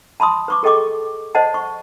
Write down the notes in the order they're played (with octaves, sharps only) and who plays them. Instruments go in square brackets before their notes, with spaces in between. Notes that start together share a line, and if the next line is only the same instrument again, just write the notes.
[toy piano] A5 B5 C6 D#6
B4 C#6 D6
G#4 A4 D#5 G5 C#6 D6
C5 D5 D#5 F#5 A5
C#6